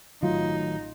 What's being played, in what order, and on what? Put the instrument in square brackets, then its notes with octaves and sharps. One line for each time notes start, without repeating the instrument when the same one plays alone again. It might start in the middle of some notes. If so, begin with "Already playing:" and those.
[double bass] A1 D#4 [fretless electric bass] D#3 F#3 A3 [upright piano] F4